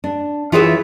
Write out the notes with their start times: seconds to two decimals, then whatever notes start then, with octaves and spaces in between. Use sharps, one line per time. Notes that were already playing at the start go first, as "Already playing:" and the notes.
0.04 D4
0.52 E3 F4 G#4 C#5 D#5 E5